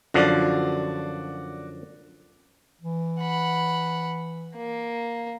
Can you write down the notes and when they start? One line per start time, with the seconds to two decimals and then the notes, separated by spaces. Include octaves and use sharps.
0.14 F#2 D3 F3 F#4 D5
2.81 E3
3.20 F#5 B5
4.56 A#3